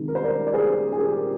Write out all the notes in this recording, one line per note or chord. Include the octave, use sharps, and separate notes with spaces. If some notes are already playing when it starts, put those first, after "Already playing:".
Already playing: C3 D#3 G#3 D#4
A#4
C5
A#4 D5
D5
G#4 C5
G#4
G4 A#4